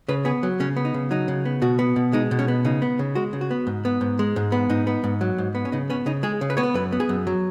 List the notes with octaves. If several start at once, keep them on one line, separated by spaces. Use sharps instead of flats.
C#3 B4
B3 G#4
F#3
C#3 C#4
B3
D#4
C#3
F#3 D#4
C#3
B3
B2 F#4
B3
B2
G#3 D#4
B2
C#4
B3
C#3 D#4
B3
C#3
G#3 F#4
C#3
F#4
B3
G#2
B3
G#2
G#3
G#2
B3
G#2 D#4
B3
G#2
F#3
G#2
B3
C#4
C#3 D#4
B3 C#4
C#3 D#4
G#3 G#4
C#3
B4
B3 C#5
B4
F#2 B4
B3
G#4
F#2
F#3